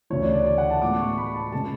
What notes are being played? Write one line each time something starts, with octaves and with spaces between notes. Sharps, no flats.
D2 C#3 E3 C#5
D5
D5
D5
F#5
A5
A2 G#3 B3 D6
C#6
B5
A5
C#3 G#3 A5